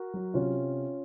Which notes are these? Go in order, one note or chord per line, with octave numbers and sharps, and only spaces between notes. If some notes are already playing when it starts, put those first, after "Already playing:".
Already playing: F#4 A#4
F#3
C3 C#4 F4